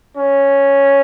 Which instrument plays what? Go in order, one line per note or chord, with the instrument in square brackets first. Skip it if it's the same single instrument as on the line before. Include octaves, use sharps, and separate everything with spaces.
[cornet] C#4